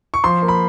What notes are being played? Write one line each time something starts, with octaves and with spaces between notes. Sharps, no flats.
C#6
F3 C6
A#3
B5